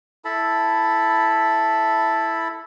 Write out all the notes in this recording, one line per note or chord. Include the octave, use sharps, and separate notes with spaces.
E4 A4 A5 B5